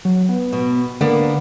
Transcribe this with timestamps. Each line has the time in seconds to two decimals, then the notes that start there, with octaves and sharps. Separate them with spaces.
0.05 F#3
0.29 B3
0.53 B2
1.01 D3 A#3 B3 D4